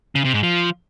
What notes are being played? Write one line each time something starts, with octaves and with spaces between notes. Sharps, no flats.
C#3
C3
G#2
F3